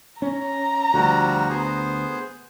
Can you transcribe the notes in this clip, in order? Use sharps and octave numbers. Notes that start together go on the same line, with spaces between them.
C#4 A#5
D2 F3 G3 F#4
B3 G#4 C5